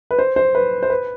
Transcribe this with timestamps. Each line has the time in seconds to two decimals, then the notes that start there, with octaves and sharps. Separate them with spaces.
0.11 B4
0.19 C5
0.36 C5
0.55 B4
0.83 C5
0.90 B4